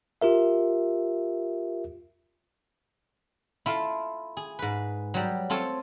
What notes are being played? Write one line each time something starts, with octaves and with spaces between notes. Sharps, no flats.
F4 G4 A#4 E5
E4 F4 A4 F5
G#4
G#2 B4
F#3 G3
C4 F4 A4 C#5